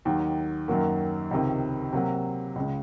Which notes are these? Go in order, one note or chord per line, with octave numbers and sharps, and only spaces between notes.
D#2 D#3 F#3
F#2 D#3 F#3 A#3
C#2 C3 D#3
C3 F#3 A#3
C#2 C#3 G#3